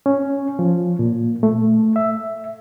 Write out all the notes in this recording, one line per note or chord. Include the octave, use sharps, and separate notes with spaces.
C#4
F3
A#2
A3
E5